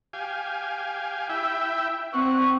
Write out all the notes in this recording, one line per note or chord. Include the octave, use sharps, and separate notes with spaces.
G4 F5 G#5
E4 E5 G5
C4 F#5 C#6